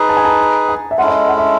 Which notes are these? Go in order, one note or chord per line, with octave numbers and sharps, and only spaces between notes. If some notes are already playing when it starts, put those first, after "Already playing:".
Already playing: D#4 G#4 B4
A5
G#5
A5
G#5
E5
G#3 C#4 E4 A4 F#5
D#5
E5
F#5
E5